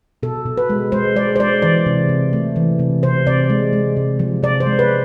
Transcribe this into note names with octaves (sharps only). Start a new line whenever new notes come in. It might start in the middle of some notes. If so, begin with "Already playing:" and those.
B2 A4
B2
B4
G#3
G#3 C5
G#3 D5
C5
G#3 D5
E3 D5
C3
C3
A3
E3
C3
C3 C5
C3 D5
G#3
G#3
C3
F3
C3 D5
C5
G#3
B4